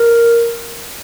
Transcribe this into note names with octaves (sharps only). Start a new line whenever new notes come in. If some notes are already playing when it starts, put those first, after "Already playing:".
Already playing: A#4